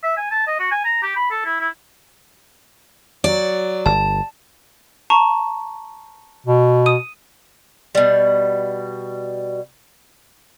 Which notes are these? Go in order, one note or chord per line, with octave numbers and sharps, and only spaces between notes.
E5
G#5
A5
D#5
F#4
G#5
A#5
G4
B5
A4
E4
E4
F#3 D5
G1 A5
A5 A#5 C#6
B2
D#6 D#7
B2 G3